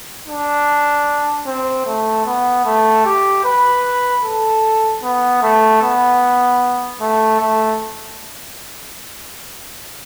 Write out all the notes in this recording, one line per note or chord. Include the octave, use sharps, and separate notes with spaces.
D4
C4
A3
B3
A3
G4
B4
A4
B3
A3
B3
A3
A3